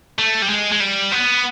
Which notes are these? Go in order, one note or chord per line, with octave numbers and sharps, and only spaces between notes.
A3
G3
G#3
G#3
G3
B3